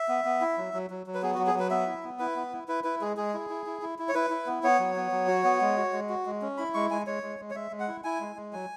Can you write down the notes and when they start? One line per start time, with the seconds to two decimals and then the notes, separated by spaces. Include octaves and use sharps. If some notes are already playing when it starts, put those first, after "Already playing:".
Already playing: E5
0.09 B3
0.25 B3
0.41 E4
0.58 F#3
0.74 F#3
0.90 F#3
1.07 F#3
1.14 B4
1.22 B3 G#4
1.34 F#4
1.38 F#3
1.47 G#4
1.54 F#3 B4
1.70 B3 E5
1.87 E4
2.03 B3
2.19 E4 B4
2.36 B3
2.53 E4
2.68 E4 B4
2.84 E4 B4
3.01 G#3 G#4
3.17 G#3 G#4
3.34 E4
3.50 E4
3.66 E4
3.82 E4
3.99 E4
4.09 C#5
4.14 E4 B4
4.30 E4
4.46 B3
4.63 B3 C#5
4.79 F#3
4.96 B3
5.12 F#3
5.28 F#4
5.44 B3
5.61 G#3
5.77 F#4
5.93 G#3
6.09 F#4
6.26 G#3
6.42 C#4
6.57 E4 B5
6.74 G#3 C#6
6.91 G#3 G#5
7.07 G#3 C#5
7.23 G#3
7.39 G#3
7.51 C#5
7.55 G#3 E5
7.71 G#3
7.80 F#5
7.88 E4
8.04 E4 G#5
8.20 G#3
8.36 G#3
8.53 F#3 G#5